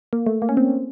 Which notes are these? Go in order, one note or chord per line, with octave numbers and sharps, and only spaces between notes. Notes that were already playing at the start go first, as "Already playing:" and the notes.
A#3
A3
A#3
C#4
C4